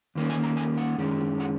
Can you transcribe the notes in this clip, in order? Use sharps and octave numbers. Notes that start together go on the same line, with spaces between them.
D#2 D#3 A#3 C#4
G#5
A#5
G#5
F#5
F#2 D#3 G#3 C#4
F#5